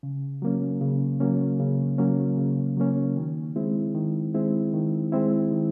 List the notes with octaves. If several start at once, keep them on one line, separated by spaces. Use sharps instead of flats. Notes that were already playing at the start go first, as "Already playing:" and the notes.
C#3
F#3 A#3 C#4
C#3
F#3 A#3 C#4
C#3
F#3 A#3 C#4
C#3
F#3 A#3 C#4
D#3
G#3 C4 E4
D#3
G#3 C4 E4
D#3
G#3 C4 E4
D#3